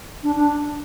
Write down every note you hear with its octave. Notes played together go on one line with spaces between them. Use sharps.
D4
D4